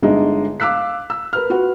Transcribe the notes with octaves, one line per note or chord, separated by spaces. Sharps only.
G1 D3 G#3 D#4 D#5
F5 D6 E6 F#6 B6
E6
A#4 B4 F6
F4 F#4 B4 F#5